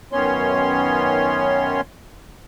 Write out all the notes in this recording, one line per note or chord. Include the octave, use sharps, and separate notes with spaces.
F#2 D#3 B3 C#4 C#5 C6